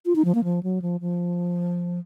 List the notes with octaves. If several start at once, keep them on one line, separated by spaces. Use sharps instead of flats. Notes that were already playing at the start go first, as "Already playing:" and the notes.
F4
D#4
F3
A#3
F3
F#3
F3
F3